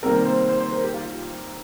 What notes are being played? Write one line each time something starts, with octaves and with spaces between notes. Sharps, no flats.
C3 D#3 G3 A#3 A#4
C5
C5
C5
A#4
G4
F4